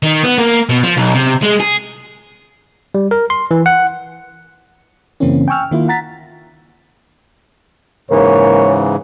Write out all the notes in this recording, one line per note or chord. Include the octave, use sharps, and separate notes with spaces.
D#3
B3
A#3
B2
F3
B1
C3
G#3
G#4
G3
A#4
C6
E3
F#5
F#2 C#3 E3 A#3 C4 C#4
G5 G#5 C#6 E6 F6
D#3 A#3 E4 F4
F#5 A#5 A6 B6
G#2 C#3 E3 A#3 C#5